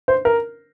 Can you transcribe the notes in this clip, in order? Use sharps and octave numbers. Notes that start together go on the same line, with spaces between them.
C5
A#4